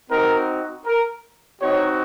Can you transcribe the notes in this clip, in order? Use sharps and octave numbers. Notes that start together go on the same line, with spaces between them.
C4 D#4 F#4 A#4
A#4
C4 D#4 F#4 C#5